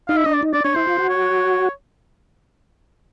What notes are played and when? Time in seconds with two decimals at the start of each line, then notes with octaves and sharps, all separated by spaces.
0.09 D#4 F5
0.17 E5
0.25 D4 D#5
0.34 D5
0.43 D#4
0.53 D4 D5
0.64 D4 C#5
0.75 E4 C5
0.87 F4
0.98 F#4
1.09 C#5